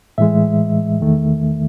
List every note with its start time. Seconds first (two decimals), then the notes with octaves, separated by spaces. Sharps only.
0.18 A2 E3 G#3 E5
1.00 E2 D#3 A3